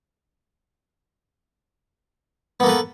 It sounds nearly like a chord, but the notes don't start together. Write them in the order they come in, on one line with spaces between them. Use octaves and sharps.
B3 A#3 A4 B4